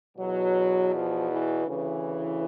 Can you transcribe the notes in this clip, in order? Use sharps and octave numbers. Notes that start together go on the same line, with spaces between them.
E2 B2 F#3
F3
E3
D2 C#3 E3